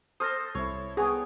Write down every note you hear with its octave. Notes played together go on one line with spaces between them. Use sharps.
A4 C5 D#6 F6 A#6
C2 E4 C#5
B3 G#4 C#5 G5